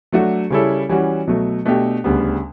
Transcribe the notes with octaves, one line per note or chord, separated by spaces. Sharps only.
F#3 A3 D4 F#4
C#3 G3 C#4 E4 A4
E3 G3 C#4 F#4
B2 F#3 A3
B2 A3 D4 G4
D2 C#3 G3 B3